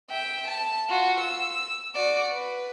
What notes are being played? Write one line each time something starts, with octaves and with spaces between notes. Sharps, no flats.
E5 G5
A5
F4 F#4
E6
F#4 D5
B4